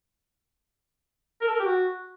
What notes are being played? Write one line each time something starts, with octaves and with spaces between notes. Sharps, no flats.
A#4
A4
A#4
G4
F#4